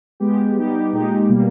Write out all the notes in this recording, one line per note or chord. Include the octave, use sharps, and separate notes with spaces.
G#3 B3 G4
G3 B3 D#4 G4
A#2 G#3 D#4 G4
B2 G3 A#3